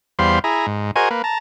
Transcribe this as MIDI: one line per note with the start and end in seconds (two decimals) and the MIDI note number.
0.19 0.39 40
0.19 0.39 55
0.19 0.39 72
0.19 0.39 77
0.19 0.39 83
0.19 0.39 84
0.44 0.66 64
0.44 0.66 68
0.44 0.66 82
0.67 0.91 44
0.96 1.09 66
0.96 1.09 68
0.96 1.09 70
0.96 1.09 72
0.96 1.09 75
0.96 1.09 80
1.11 1.22 58
1.11 1.22 71
1.24 1.38 81
1.24 1.38 82